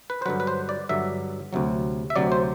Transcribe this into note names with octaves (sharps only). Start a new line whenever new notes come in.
B4
C5
G2 D3 F#3 B4
B4
C5
D5
G2 D3 F#3 E5
D2 C3 F#3
E5
D2 C3 F#3 D5
C5